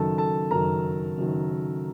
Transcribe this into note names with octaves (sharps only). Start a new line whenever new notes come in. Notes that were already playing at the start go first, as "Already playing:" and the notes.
Already playing: F#1 F#2 D#3 F#3 A4 A5
A4 A5
F#1 F#2 D#3 F#3 A#4 A#5
F#1 F#2 D#3 F#3